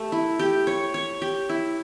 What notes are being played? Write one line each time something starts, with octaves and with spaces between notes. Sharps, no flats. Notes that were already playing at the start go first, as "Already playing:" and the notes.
Already playing: A3 G4
E4
G4
C#5
C#5
G4
E4